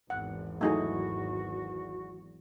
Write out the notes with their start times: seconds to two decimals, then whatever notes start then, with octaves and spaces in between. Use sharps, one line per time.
0.10 G#1 E2 F#5
0.61 F#3 A3 D#4 E4 F#4 G#4